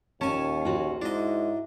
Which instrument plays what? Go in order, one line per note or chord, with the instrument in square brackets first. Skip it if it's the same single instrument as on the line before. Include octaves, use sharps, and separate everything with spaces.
[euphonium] D#2 [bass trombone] A#2 [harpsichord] C#4 G#5 [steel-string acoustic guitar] A5
[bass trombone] A#1 [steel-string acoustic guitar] F4 F#4
[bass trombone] G#2 [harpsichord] D4 D#5 [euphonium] E4